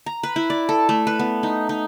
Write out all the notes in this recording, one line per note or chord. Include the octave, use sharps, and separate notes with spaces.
A#5
B4
E4
D5
A4
A3
B4
B3
D#4
D#4